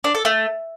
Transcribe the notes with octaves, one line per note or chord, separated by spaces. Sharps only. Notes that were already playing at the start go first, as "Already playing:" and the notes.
D4
A4
A3